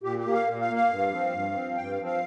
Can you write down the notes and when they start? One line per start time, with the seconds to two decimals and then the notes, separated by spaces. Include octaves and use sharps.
0.03 A#2 G4
0.19 G4
0.25 A#3
0.33 F5
0.47 A#2
0.61 F5
0.69 A#3
0.76 F5
0.91 G2
1.12 F3 C4
1.33 G2
1.55 F3 C4
1.76 G2 G5
1.91 F5
1.99 F3 C4
2.06 F5